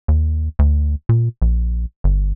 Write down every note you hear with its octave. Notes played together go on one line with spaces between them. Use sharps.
D#2
D2
A#2
A#1
G1